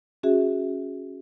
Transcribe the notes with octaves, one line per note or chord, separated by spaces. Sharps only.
C#4 F#4 G#4 E5